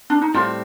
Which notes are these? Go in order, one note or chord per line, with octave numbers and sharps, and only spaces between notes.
D4
D#4
A2 G3 C4 F4